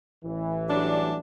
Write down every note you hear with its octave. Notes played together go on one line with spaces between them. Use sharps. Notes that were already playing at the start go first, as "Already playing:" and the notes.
A1 E3
F#3 G3 D4